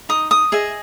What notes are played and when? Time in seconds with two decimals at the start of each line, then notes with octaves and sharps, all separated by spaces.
0.09 D#4 D#6
0.31 D#6
0.52 G#4 D#5 E5